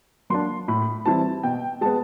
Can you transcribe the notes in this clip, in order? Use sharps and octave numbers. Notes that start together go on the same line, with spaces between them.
F#3 A#3 D4 C6
A2 B5
E3 G3 C4 E4 A5
B2 G5
G#3 B3 A5